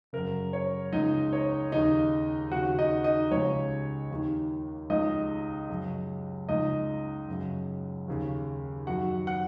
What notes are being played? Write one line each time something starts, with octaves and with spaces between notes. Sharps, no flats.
F#2 C#3 A#4
C#5
C#2 C#3 D#4 D#5
C#5
D#2 C#3 D#4 D#5
D#2 C#3 F#4 F#5
D#4 D#5
D#4 D#5
C#2 C#3 C#5
D#2 D#3
C#2 C#3 D#4 D#5
F#2 C#3
C#2 C#3 D#4 D#5
F#2 C#3
D#2 C#3
F#2 D#3 F#4 F#5
F#5 F#6